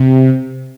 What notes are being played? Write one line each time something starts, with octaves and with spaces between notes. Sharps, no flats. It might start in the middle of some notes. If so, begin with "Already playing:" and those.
Already playing: C3